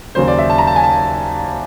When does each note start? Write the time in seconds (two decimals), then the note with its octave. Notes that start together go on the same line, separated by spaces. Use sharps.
0.15 D#2 C#3 F#3 A#3 C5
0.28 D5
0.38 E5
0.50 A5
0.58 A#5
0.67 A5
0.76 G#5
0.83 A5